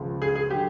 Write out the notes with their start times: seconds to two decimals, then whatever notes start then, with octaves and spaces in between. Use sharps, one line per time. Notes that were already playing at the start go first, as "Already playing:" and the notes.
Already playing: C#2 C#3 F3 G#3
0.22 G#4
0.36 G#4
0.50 D3 F#3 G4